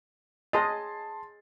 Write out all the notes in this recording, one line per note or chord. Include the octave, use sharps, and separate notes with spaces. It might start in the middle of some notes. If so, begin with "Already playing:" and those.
G#4 D#5 A5 C6 A6